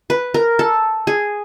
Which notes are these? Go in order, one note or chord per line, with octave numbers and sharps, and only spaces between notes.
B4
A#4
A4
G#4